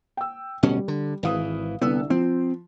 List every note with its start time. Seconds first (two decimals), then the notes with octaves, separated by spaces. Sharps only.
0.17 G5 E6
0.63 D1 B2 G3 C#4
0.88 D3
1.23 G#1 E3 B4 F5 D#6
1.81 C2 D3 B3 E6
2.10 F3 C4